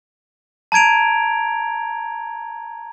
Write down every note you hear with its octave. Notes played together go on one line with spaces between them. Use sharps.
A5 A#5 G#6 D7 F7